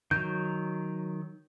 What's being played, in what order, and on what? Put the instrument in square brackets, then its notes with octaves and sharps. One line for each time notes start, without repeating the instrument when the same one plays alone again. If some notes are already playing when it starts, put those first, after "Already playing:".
[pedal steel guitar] D#3 F#3 [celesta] G6